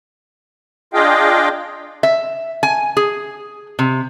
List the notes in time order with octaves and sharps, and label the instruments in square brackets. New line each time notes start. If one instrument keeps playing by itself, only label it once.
[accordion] D4 F4 G#4 D#5 F5 G5
[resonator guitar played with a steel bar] E5
G#5
G#4
C3